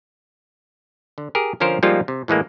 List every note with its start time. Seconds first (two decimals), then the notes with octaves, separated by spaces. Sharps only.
1.18 D3
1.35 G4 G#4 A#4
1.60 D3 F3 C#4 A#4 C5 F5
1.83 F3 G3 G#3 A#3 D#4 F4
2.08 C3
2.28 A2 E3 G#3 A#3